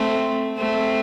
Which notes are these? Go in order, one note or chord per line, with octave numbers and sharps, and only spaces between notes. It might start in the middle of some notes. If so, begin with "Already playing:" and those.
Already playing: A3 C4
A3 C4